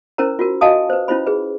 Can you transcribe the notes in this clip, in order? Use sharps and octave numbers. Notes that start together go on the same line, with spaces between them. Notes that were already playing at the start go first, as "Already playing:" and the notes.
C#4 E4 A#4 C5 A#5
F4 F#4 A#4
F#4 D#5 F5 G#5 A5 D#6
B4 C5
C#4 E4 F4 C5 B5
G#4 B4